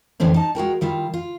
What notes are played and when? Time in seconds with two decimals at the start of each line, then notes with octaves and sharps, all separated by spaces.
0.20 F2 A2 D3 E3 C4 C#4
0.34 D#4 A5
0.55 G#3 F#4 A#4 G5
0.81 D#3 G3 E4 F4
1.14 F4